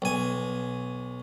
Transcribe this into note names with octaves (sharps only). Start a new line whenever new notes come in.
B1 G#5